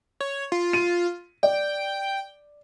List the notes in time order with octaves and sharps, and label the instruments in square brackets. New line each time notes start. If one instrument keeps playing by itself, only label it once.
[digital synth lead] C#5
F4
[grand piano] D#7
[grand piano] D5 [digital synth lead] G5